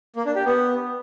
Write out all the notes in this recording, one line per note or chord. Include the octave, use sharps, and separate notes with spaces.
A#3
D4
G4
B3